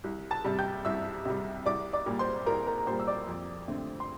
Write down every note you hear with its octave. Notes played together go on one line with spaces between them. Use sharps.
C2
A5 A6
C3 G3
G5 G6
C2 E5 E6
C3 G3
C2 D5 D6
D5 D6
A#2 G3
C5 C6
C2 A#4 A#5
A#4 A#5
A#5
A#2 G3 C5 C6
E6
D5 D6
F2
D3 A3 C4
C6